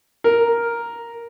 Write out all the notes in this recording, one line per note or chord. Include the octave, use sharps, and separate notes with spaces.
A#4